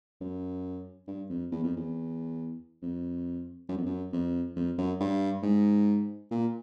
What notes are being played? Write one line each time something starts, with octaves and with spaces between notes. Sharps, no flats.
F#2
G2
F2
E2
F2
E2
F2
F#2
F2
F#2
F2
F2
F#2
G2
G#2
A#2